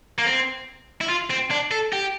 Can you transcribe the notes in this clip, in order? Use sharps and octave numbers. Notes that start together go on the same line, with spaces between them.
A#3
C4
E4
F4
C4
D4
A4
G4